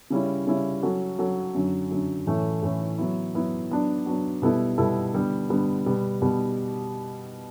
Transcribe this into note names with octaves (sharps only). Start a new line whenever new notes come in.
C#3 G3 C#4 E4
C#3 G3 C#4 E4
F#3 C#4 F#4 A4
F#3 C#4 F#4 A4
F#2 D3 F#3
F#2 D3 F#3
A2 E3 A3 C#4
A2 E3 A3 C#4
F#3 B3 E4
F#3 B3 E4
F#3 B3 D4
F#3 B3 D4
B2 G3 B3 E4 A4
B2 G3 B3 E4 A4
D3 G3 B3
D3 G3 B3
B2 G3 B3
B2 G3 B3